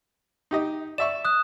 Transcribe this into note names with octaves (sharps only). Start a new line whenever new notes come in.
D#4 G4 D#5
D5 E5 C#6 E7
D#6 F#6